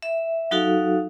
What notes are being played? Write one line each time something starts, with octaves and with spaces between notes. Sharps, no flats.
E5
F#3 D#4 F#4 A4 F5